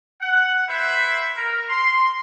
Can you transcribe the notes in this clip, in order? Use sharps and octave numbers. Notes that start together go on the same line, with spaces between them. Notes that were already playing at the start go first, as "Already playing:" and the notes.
F#5
E4 B4 C5 E5 F#5 B5
A#4
C6